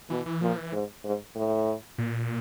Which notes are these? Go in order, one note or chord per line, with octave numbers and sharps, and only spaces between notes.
B2 E3
E3
A#2 F3
E3
G#2
G#2
A2
A#2